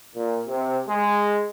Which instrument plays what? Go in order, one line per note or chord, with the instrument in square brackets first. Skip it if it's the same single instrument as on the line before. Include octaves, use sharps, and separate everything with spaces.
[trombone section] A#2
C3
G#3